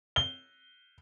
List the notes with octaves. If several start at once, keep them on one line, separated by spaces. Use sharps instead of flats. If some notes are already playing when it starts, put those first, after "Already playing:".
G7